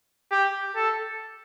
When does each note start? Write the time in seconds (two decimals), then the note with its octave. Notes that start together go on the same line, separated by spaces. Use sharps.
0.31 G4
0.75 A4